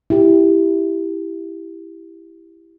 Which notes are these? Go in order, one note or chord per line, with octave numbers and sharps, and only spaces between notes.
E4 G4